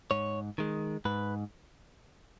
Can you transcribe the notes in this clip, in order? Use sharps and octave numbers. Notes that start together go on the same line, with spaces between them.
G#2 C#5
D#3 G#3
G#2 B4